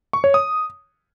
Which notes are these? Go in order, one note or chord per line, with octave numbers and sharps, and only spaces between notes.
C#6
C#5
D#6